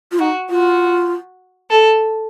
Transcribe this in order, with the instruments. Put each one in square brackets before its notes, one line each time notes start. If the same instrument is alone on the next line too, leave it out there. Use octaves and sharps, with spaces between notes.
[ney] F4
[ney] D#4 [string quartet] F#4
[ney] F4 [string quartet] F#4
[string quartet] A4